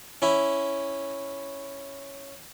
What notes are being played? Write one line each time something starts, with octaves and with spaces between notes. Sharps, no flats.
C#4 E4